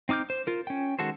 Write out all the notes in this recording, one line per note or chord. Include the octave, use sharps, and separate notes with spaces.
C4 D#4 D6 F6 G6
C5
F4 A#4
C#4 G5
D#3 G#3 F#4 A4 C5